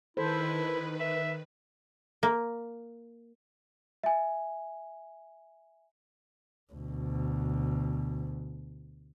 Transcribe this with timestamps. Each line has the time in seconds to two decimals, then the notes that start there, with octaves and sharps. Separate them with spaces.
0.17 D#3 E4 A4 B4 C5
1.00 E5
2.23 A#3
4.04 E5 G#5
6.73 D2 B2